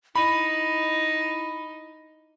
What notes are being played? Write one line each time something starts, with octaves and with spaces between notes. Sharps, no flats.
D#4 E4 B5